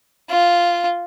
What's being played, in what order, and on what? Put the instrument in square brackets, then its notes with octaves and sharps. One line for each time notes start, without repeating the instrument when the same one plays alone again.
[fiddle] F4